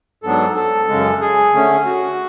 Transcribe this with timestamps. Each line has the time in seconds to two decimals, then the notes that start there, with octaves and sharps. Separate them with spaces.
0.23 G#2 F#3 B3 D4 A4
0.56 A4
0.88 F#2 C#3 G#3
1.21 G#4
1.54 D3 A3 C#4
1.85 F#4